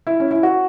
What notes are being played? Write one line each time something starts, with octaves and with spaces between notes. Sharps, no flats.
E4
C#4
E4
F#4